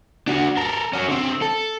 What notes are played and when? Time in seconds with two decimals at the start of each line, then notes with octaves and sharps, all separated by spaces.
0.28 D4 F#4
0.57 A4 A#4
0.93 C#4 F#4
1.08 D3 C4
1.42 A4